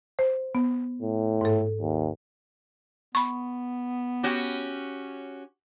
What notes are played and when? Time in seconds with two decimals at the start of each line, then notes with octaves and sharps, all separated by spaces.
0.19 C5
0.55 B3
1.02 A2
1.41 G#2 A4
1.80 D#2
3.15 B3 B5 C#6
4.23 C#4 F#4 G4